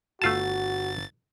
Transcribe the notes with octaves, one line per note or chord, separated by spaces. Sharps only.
G1 A3 F4 F#4 A5 A6